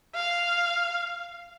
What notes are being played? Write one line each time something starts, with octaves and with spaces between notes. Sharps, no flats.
F5